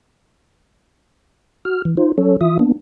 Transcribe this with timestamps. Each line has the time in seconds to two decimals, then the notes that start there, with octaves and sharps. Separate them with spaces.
1.65 F#4 F6
1.85 E3
1.97 D#4 F4 C5
2.18 F#3 C#4 A4 C#5
2.41 E3 F4 E5 D#6
2.59 A#3 B3 D4